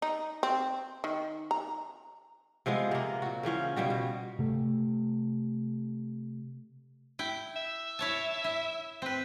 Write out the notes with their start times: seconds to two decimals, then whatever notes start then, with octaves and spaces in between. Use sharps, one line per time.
0.02 D#4
0.43 C4
1.04 D#3
1.51 A#5
2.66 C3 F3 G#3 B3
2.91 C3 A#3
3.22 A#2 F#4
3.43 C#3 E3 F3 C#4
3.76 B2 F3 G3 F#4
3.90 B2
4.39 C3 A3
7.19 E4 G5
7.56 E5
7.99 E4 C#5 A5
8.44 E4
9.02 C4 B4